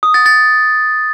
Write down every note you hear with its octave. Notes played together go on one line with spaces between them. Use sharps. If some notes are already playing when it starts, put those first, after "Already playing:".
D#6
A6
A6